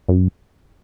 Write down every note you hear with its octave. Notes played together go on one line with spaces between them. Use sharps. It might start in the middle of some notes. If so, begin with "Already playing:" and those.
F#2